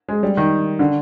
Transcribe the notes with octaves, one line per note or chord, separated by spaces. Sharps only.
G#3
G3
D#3
D3